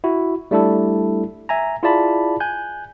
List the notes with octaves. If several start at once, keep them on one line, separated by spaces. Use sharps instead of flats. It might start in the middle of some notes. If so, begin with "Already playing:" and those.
E4 F#4
G3 A3 D4 E4 A4
E5 G#5 A#5
E4 F4 G#4 D5 A5 B5
G#5 F#6 G6